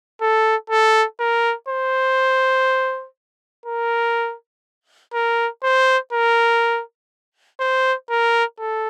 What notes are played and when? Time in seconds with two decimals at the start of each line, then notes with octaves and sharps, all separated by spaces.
0.21 A4
0.70 A4
1.20 A#4
1.69 C5
3.66 A#4
5.14 A#4
5.63 C5
6.13 A#4
7.60 C5
8.10 A#4
8.59 A4